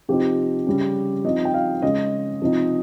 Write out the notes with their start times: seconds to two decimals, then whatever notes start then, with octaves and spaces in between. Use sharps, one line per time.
0.09 C3 F3 C4 D#4 G4
0.67 C#3 G3 C#4
1.24 F3 C4 D#4 D#5
1.45 G5
1.54 F5
1.82 C#3 G#3 C#4 D#5
2.41 C3 F3 C4 D#4